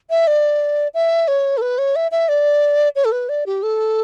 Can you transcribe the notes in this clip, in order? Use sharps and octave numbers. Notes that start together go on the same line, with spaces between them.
E5
D5
E5
C#5
A4
B4
C#5
E5
E5
D5
C#5
A4
B4
D5
G4
A4